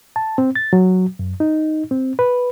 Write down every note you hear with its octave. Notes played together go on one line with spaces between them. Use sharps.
A5
C4
A6
F#3
F#2
D#4
C4
B4